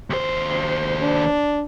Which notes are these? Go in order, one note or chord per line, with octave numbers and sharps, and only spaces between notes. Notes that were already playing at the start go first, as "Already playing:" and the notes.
D#2 C5
D4